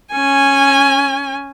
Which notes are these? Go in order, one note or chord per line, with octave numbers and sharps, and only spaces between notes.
C#4 G#5